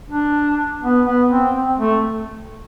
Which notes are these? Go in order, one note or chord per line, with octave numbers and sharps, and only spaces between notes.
D4
B3
B3
C4
C4
A3